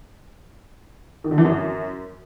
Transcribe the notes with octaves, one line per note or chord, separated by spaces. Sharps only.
D#3
D3
E3
F#2